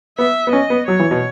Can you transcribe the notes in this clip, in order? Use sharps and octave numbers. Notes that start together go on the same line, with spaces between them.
B3 E5
B3
C#4 D#5
B3
F#3 C#5
E3
B2